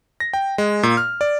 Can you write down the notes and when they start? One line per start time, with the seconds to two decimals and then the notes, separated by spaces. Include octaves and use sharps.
0.20 A#6
0.33 G5
0.58 G#3
0.83 A#2
0.97 F6
1.21 D5